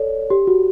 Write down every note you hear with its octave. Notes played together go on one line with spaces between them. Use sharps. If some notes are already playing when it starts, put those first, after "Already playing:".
Already playing: A4 C#5 D5
G4
F#4